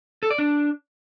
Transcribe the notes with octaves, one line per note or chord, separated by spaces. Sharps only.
A4
D5
D4